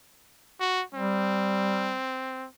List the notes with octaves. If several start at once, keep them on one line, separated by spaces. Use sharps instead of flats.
F#4
G3 C4